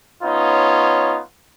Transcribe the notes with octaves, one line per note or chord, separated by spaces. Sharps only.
B3 C#4 D#4 F4 C#5